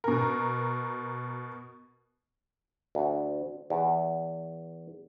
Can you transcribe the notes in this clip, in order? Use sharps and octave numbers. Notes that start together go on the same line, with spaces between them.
B2 A#4
D2
E2